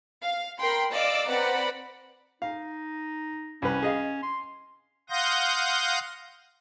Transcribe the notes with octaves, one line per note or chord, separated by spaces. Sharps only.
F5
A#4 G5 B5 C6
D5 D#5 F5 D6 E6
C4 B4 D5 F#5 A#5 B5
D#4 F5
C2 C#4 B4
G#4 D#5 F5
C6
F5 F#5 C6 D#6 G6 A#6